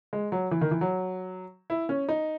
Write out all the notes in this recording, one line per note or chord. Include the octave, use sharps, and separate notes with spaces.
G#3
F#3
E3
D#3
E3
F#3
E4
C#4
D#4